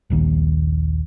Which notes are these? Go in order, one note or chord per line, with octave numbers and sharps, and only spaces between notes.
D#1 A#1 D#2